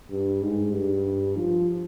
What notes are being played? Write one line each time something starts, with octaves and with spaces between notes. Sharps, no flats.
G2
G#2
G2
F3